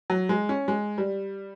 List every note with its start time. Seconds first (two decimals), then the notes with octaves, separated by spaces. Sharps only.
0.10 F#3
0.29 G#3
0.49 C#4
0.68 G#3
0.98 G3